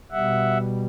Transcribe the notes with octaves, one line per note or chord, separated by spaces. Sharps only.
B2 G3 E5 F#5